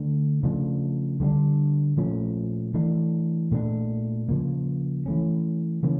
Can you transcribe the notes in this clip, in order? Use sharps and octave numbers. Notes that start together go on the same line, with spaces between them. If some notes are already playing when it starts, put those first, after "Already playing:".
Already playing: D3 A3 D4
C#3 F3 A3 D4
D3 G3 A#3 D4
A#2 F3 A3 C#4
E3 A3 D4
A#2 A3 D4
C#3 F3 A#3
E3 A3 C#4
C#3 E3 A#3 C#4